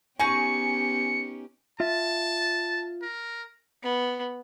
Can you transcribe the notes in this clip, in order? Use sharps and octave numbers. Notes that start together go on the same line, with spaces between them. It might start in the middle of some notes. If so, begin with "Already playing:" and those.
B3 C#4 D#4 G4 G#4 G#5 C#6 C#7
F4 E5 A5
A#4
B3